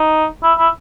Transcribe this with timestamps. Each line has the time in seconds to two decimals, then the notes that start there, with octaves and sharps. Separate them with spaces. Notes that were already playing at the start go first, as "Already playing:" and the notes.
Already playing: D#4
0.43 E4
0.58 E4